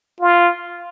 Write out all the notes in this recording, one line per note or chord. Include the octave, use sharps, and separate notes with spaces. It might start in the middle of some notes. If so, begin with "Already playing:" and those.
F4